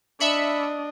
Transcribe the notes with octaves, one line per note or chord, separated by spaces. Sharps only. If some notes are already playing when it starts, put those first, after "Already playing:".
D4 D#5 E5 B5 C#7